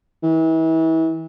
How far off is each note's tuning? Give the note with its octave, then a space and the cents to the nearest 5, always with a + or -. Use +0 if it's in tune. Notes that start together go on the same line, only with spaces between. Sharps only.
E3 -35